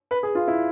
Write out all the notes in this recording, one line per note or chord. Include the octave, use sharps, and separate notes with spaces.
B4
G#4
F4
E4